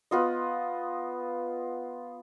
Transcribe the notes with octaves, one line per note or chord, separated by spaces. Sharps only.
B3 F4 D#5